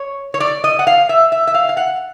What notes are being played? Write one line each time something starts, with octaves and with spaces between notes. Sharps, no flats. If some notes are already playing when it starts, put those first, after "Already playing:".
Already playing: C#5
C#5
D5
D#5
F#5
F5
E5
E5
E5
F5
F5
F#5